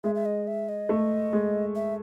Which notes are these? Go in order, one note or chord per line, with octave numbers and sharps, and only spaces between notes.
G#3 E5
E5
D#5
E5
D#5
A3
G#3
E5